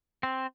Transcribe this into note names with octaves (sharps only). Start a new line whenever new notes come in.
C4